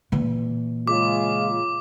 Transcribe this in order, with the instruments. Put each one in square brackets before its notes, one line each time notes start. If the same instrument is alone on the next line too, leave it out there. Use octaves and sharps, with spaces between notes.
[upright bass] A#2 E3
[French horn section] C#3 G#3 F4 [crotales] D6